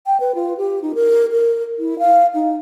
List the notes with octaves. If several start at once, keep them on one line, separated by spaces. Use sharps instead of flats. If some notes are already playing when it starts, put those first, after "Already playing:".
G5
B4
F4
G4
D#4
A#4
A#4
E4
F5
D#4